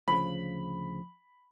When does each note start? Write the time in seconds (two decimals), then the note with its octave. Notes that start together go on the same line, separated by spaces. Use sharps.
0.08 D2 C#3 F3 B5